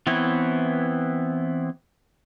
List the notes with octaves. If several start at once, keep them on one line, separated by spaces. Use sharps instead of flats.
E3 B3 C4 E4 C#5